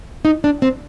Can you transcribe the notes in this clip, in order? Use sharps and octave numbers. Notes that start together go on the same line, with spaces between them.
D#4
D4
C4